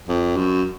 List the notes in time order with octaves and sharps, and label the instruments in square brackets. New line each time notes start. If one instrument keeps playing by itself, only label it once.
[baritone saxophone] F2
F#2